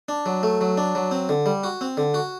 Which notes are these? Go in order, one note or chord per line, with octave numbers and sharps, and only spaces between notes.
D4
F#3
A3
F#3
D4
F#3
C4
D3
G3
F#4
C4
D3
F#4